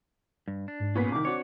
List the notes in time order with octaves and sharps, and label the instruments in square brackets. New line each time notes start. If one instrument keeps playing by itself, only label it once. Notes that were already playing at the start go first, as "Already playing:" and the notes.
[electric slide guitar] G2
D4
[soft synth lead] G#2
[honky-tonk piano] A#2 B3 B6 [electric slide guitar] C#4 G#4
[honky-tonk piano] C2 D#3 [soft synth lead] D6
[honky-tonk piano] C4 D4 F#4 [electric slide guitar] C#5